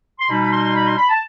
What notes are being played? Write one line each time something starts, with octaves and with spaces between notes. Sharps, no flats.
C6
B2 G3 D#4 B5
B5
C6
B5
C6
B5
A5